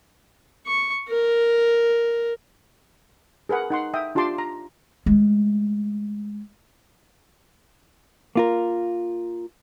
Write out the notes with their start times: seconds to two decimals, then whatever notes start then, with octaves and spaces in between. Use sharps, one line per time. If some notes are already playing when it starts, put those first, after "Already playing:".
0.67 C#6
1.09 A#4
3.49 G#4 A#4 B4 F#5
3.70 D#4 F#5 C6
3.94 E5 G5 D#6
4.15 D4 F4 G4 A5 C6 D6
4.38 A#5
5.06 G#3 A3
8.35 A#3 F4 A#4